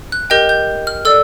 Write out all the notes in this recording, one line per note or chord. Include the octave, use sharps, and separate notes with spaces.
F#6
G4 A#4 D#5 G5 G6
G6
F6
A4 D5 E6